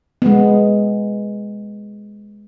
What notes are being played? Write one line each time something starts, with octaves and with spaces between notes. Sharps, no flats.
G#3 B3